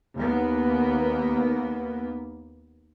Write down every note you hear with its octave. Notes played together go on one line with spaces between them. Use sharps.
D#2 A#3 B3